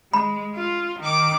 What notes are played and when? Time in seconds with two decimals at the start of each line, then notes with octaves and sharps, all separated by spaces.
0.14 G#3 B5
0.55 F4
0.99 D#3 D6